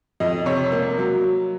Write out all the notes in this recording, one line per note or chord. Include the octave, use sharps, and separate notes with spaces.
F2 D#5
C3 C#5
A#3
F#3